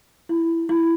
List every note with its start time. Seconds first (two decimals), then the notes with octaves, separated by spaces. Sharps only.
0.29 E4
0.69 E4